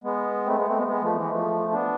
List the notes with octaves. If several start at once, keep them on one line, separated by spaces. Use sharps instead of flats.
G#3 B3
A3 C4
G#3 B3
A3 C4
G#3 B3
G#3 B3
F3 A3
E3 G#3
F3 A3
B3 D4